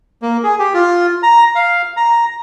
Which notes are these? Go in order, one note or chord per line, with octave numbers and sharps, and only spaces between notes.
A#3
G#4
G4
F4
A#5
F5
A#5